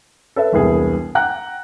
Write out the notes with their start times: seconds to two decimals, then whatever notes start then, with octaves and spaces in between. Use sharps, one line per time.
0.36 A4 B4 E5
0.52 E1 C2 B3 G#4
1.15 F#5 G5 A#5 F#6